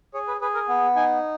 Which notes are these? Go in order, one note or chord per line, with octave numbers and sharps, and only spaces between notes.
G#4 C#5
B4
G#4 B4
A#4
B3
D#4 G#5